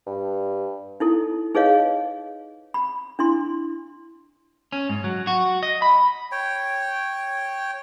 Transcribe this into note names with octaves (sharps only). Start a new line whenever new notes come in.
G2
D#4 E4 A4
D#4 G#4 B4 C#5 D#5 F5
B5
D4 E4 C6
C#4
G#2
F#3
F#4
D#5
B5
C#5 G5